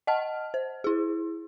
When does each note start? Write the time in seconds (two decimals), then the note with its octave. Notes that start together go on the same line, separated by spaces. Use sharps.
0.07 D#5 F#5 A5 F6
0.54 C5
0.84 E4 G#4